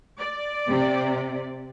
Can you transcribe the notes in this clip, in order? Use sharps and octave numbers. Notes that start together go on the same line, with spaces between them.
D5
C3